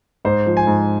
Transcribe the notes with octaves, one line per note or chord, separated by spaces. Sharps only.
G#2 C5
F3
G#5
G#2